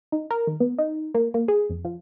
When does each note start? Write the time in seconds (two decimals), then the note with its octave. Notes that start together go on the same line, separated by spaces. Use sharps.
0.12 D#4
0.31 A#4
0.47 D#3
0.60 B3
0.78 D#4
1.14 A#3
1.34 A#3
1.48 G#4
1.70 F2
1.85 F3